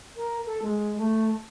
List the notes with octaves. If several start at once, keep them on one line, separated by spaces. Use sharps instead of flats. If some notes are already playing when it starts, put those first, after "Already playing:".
A#4
A4
G#3
A3